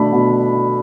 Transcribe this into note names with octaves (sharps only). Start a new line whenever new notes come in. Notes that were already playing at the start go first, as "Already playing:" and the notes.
Already playing: B2 A3 D4 B5
B2